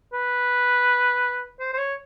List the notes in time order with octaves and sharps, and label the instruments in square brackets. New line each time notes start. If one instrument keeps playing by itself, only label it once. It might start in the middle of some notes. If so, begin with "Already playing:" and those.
[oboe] B4
C5
C5
C#5